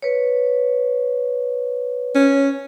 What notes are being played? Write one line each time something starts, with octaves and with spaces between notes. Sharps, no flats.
B4 C#5
C#4